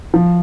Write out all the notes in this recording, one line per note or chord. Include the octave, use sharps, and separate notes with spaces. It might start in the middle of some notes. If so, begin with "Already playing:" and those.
F3